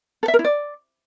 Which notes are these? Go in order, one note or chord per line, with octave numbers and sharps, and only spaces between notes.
A4
E5
A#4
E4
D5